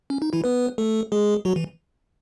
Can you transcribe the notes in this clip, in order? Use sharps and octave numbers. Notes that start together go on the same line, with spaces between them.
C#4
D#4
E3 E4
B3 B4
A3 A4
G#3 G#4
F#3 F#4
E3